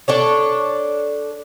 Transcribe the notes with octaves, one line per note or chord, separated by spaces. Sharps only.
D4 A4 C#5